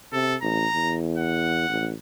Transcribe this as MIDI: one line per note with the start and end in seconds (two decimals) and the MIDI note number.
0.13 0.36 48
0.13 0.37 69
0.42 0.66 33
0.42 0.97 82
0.74 1.65 40
1.18 1.90 78
1.70 1.93 33